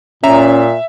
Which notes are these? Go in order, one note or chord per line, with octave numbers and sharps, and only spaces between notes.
A#2 C#4 E5 A#5